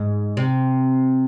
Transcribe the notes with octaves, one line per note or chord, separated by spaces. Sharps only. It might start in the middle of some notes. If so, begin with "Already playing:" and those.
Already playing: G#2
C3